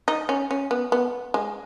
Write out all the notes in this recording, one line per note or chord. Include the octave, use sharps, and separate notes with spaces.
D#4
C#4
C#4
B3
B3
G#3